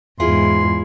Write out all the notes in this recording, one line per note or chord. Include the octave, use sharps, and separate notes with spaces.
E2 G#2 E4 F4 G#4 C6